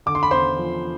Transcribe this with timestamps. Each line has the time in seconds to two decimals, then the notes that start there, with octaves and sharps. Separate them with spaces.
0.06 D3 D6
0.15 C6
0.23 B5
0.31 E2 C5 C6
0.59 F3